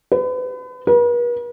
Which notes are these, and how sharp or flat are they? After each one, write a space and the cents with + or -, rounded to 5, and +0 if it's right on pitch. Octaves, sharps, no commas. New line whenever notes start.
B4 +35
B4 -45